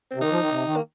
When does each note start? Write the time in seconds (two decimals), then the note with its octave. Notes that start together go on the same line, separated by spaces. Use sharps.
0.11 C3 C4
0.20 D#3 D#4
0.31 F3
0.41 D#3
0.50 C3
0.66 D#3
0.76 A#3